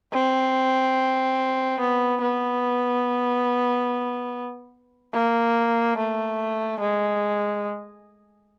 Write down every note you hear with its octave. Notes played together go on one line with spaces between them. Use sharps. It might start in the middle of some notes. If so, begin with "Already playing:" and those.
C4
B3
B3
A#3
A3
G#3